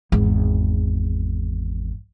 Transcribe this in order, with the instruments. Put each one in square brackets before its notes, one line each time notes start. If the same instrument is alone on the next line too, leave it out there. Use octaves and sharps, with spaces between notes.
[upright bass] G#1 E2